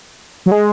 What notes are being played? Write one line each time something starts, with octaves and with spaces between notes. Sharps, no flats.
F#3
G#3